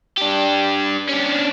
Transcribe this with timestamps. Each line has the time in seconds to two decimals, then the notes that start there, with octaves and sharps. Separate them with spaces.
0.17 D4 G4
1.09 C#4 D4